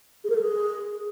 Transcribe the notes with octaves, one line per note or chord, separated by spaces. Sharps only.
G#4
A#4
A4
G#4